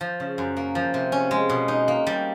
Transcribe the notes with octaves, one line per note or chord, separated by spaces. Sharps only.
F3
C#3
F#2
A#3
F3
C3
C#4
G#3
B2
D#4
A#3
G3